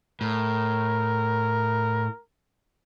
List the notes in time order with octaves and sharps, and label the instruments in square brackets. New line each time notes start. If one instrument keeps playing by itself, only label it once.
[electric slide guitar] A2 [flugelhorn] A#4